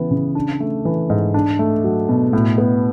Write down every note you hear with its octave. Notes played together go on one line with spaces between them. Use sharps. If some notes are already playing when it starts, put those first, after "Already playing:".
Already playing: C#3 E3 B3
C#3
D4
A3
E3
G#2
D4
A3
F#3
B2
A2
B3